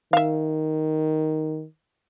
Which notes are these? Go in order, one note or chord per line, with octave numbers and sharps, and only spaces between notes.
D#3 E5 F5